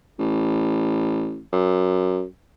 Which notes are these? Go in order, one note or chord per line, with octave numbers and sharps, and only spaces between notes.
A1
F#2